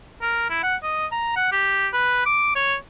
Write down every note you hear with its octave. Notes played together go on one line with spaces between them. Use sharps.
A#4
E4
F#5
D#5
A#5
F#5
G4
B4
D6
C#5